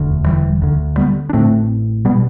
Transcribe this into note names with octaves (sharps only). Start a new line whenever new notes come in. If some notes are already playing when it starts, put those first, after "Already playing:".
Already playing: E1 D2 D3
E3 G3
D2 D3
G3 B3
D4
A1 A2 A3 C4
B2 G3 B3